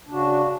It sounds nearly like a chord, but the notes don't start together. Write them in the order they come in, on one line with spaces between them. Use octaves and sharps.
D4 C#3 F#4